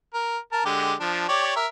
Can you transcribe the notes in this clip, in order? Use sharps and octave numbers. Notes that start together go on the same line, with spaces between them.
A#4
A#4 A5
D3 G#3 G4
F3 D4
G4 C#5 D5
A#4 E5